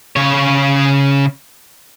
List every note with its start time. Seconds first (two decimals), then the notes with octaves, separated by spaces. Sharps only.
0.16 C#3 C#5